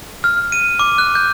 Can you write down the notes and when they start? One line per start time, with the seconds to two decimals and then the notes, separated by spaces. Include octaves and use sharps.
0.24 F6
0.52 D#7
0.79 D6
0.98 F#6
1.15 G6